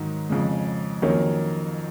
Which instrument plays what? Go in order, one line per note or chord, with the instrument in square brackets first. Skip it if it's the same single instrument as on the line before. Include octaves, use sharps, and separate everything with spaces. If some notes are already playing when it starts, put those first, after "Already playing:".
Already playing: [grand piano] G#2 D#3 F#3
F2 C#3 G#3
F2 D#3 F#3 A#3 C#4